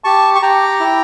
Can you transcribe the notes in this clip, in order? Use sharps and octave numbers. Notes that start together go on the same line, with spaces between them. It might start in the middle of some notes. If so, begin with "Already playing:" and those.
G4 A5 C#6
C#6
G4 G5 A#5
E4